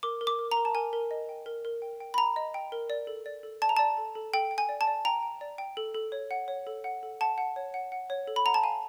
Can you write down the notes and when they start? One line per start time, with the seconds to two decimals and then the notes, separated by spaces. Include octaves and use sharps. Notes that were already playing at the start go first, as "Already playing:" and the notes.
0.03 A#4 D6
0.21 A#4
0.27 D6
0.39 A#4
0.51 A#5
0.57 A#4
0.65 A5
0.75 A#4 G#5
0.93 A#4
1.11 D#5
1.29 G5
1.46 A#4
1.65 A#4
1.82 G5
2.00 G5
2.14 B5
2.18 G5 A#5
2.36 D#5
2.54 G5
2.72 A#4
2.90 D5
3.07 A4
3.26 D5
3.43 A4
3.62 D5 A5
3.69 A#5
3.77 D5 A5
3.98 A4
4.15 A4
4.33 A4 G5
4.51 G5
4.58 G#5
4.69 D5
4.81 A5
4.87 D5
5.05 G5 A#5
5.23 G5
5.41 D5
5.58 G5
5.77 A4
5.95 A4
6.12 C#5
6.31 F#5
6.48 C#5
6.67 A4
6.84 F#5
7.03 A4
7.21 F#5 A5
7.38 F#5
7.56 C#5
7.74 F#5
7.92 F#5
8.10 C#5
8.27 A4
8.36 B5
8.46 F#5 A#5
8.54 A5
8.63 F5 G#5